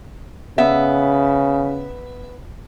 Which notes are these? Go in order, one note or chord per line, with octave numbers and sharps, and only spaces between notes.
C#3 B3 E5